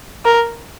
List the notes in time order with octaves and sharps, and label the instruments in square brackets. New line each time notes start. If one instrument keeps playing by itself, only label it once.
[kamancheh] A#4